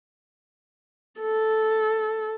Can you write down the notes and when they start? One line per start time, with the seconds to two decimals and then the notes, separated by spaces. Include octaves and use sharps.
1.20 A4